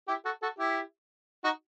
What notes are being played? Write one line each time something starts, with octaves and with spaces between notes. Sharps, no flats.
E4 G4
F#4 A4
F#4 A4
E4 G4
D#4 F#4